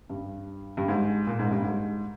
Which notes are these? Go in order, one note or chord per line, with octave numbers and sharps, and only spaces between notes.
G2
G2
G#2
A#2
G#2
G2
G#2